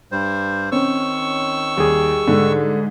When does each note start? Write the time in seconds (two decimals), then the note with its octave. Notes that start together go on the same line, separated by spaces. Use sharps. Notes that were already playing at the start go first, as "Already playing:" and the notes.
0.12 G2 G3 C5
0.72 D#3 C4 C#4 C#6 E6
1.77 D#2 G3 G#4
2.28 G#2 D3